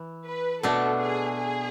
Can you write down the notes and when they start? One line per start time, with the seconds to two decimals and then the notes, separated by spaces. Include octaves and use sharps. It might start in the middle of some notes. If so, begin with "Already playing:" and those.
Already playing: E3
0.26 B4
0.63 B2 A3 D4 A4
1.01 G#4
1.38 G#4